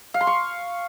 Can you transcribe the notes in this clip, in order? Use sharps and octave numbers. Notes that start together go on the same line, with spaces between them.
F5
C6
C#6